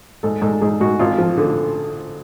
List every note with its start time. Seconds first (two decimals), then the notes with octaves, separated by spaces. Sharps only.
0.23 G#2 A4
0.42 G#2 A4
0.61 G#2 G#4
0.81 G#2 F#4
0.99 G#1 F4
1.18 F3
1.37 D3